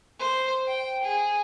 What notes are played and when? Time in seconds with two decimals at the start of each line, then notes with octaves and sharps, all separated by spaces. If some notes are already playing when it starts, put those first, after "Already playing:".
0.19 C5
0.67 G5
1.03 G#4